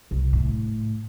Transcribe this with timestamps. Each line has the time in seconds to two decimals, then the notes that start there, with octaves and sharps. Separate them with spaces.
0.11 C2
0.33 A2